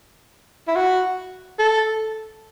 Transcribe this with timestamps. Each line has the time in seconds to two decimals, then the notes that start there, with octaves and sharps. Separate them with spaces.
0.68 E4
0.76 F#4
1.59 A4